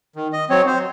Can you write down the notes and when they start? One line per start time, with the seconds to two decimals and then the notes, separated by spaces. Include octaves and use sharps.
0.16 D#3
0.33 D#5
0.49 F#3 C4 C#5
0.67 C5